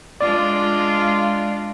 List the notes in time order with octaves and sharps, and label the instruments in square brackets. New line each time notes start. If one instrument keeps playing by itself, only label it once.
[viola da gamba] G#3 D4 F4 [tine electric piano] D5